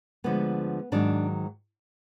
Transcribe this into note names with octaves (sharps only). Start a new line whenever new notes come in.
D2 D3 F3 G#3 B3
G#2 D#3 F#3 D4